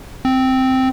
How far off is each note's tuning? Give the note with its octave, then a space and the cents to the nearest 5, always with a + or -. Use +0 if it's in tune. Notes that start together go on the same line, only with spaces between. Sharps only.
C4 -5